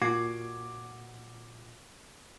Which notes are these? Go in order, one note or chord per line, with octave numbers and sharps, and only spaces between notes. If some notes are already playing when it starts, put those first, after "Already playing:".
A#2 F#4 D6 G#6 C7